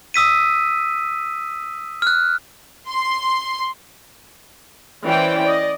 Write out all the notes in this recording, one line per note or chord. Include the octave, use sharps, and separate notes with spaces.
D#6 E6 B6 D#7
F6 F#6
C6
E3 C#4 C5 D5 G5
D5 D#5